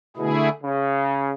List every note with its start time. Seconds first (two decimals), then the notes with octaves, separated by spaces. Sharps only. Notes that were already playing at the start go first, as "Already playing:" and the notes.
0.17 B2 D3 A3 E4 G#4
0.63 C#3